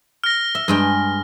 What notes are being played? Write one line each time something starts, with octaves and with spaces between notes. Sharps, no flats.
F6 A#6
E5
G2 G#3 G5